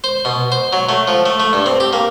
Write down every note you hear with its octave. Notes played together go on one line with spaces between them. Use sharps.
C5
B2
C5
F#3
A3
F3
A3
A3
G2
C4
G4
A#3